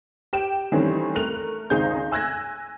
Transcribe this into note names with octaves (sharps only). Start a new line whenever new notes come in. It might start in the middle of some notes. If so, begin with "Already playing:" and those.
G4 G5 D7 E7
D#3 E3 G3 A3 C4 C#4
A3 A#4 F#6 F7
G#1 C#2 C4 D#4 G#4 G6
G#5 E6 F#6 G#6 A#6